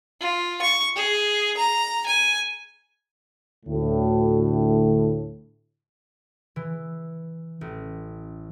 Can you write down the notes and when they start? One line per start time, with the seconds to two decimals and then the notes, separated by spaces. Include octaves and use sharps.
0.21 F4
0.62 C#6
0.96 G#4
1.57 A#5
2.06 G#5
3.66 D2 A2
6.56 E3
7.61 A1